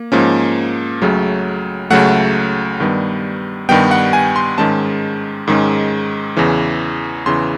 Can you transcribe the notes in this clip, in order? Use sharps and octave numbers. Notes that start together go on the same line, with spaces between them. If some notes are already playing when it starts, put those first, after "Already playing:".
Already playing: A#3
G#2 F3 A#3 C#4
C#2 C#3 F#3 A3
C#2 C#3 F#3 A3 F#5
G2 D#3 G3 B3
G2 D#3 G3 B3 G5
F#5
G#5
C6
G#2 D#3 G#3 C#4 A5
G#2 D#3 G#3 C#4
E2 C#3 E3
E2 C#3 E3 C6